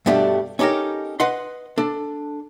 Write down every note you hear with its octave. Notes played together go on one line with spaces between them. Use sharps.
G2 B2 G3 A3 D4
C#4 D#4 G4 A4 A#4
B4 D#5 F#5 C6
D4 A4